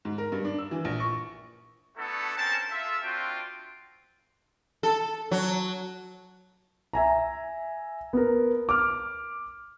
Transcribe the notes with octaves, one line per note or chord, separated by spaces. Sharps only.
G#2
A#4
G2
D4
E6
E3
A#1
C#6
A3 B3 D4 E4 F#4 A4
C4 C#4 A#4 C5 A5
F4 A4 E5
C4 D4 F4 F#4 G5
A4
F#3
E5 G#5 A#5
B3 A#4
D6 F6